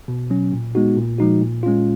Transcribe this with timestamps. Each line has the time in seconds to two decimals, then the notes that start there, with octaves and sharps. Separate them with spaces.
0.08 B2
0.30 F#3 C#4
0.52 A#2
0.75 G#3 B3 D#4 F#4
0.97 A#2
1.18 F3 G#3 D#4 F#4
1.41 A#2
1.63 G#3 C#4 F4